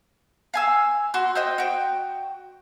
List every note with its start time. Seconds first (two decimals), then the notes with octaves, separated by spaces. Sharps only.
0.54 F5 G#5 E6
1.14 F#4 C6
1.35 C5 D#5 G5
1.58 F#4 G5